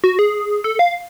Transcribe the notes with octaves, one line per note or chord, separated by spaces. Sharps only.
F#4
G#4
A4
F5